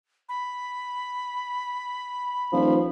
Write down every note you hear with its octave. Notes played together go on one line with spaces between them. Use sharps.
B5
D#1 F3